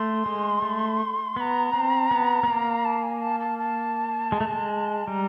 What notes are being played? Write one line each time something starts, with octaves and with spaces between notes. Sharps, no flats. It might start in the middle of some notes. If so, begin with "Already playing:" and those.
Already playing: A3 C6
G#3
A3
B3 A#5 B5
C4
B3
B3
A#3
A5
G#5
A5
A5
A5
G#3
A3
G#3
G3 A#5